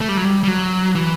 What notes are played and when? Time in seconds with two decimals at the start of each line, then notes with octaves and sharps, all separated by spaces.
0.01 A3
0.09 G3
0.17 F#3
0.24 G3
0.43 G3
0.48 F#3
0.95 E3